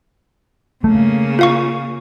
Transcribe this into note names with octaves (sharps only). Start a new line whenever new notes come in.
C#3 A3 A#3
F4 F5 C#6